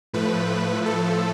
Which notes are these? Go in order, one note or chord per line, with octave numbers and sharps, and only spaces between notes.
A2 F3 A3 B4
A4